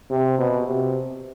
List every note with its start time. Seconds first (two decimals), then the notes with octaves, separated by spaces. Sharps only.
0.11 C3
0.39 B2
0.68 C3